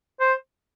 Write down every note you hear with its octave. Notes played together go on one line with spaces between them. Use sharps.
C5